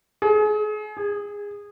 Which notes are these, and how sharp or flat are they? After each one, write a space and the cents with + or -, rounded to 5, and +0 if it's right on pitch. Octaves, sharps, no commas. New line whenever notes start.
G#4 +35
G#4 -20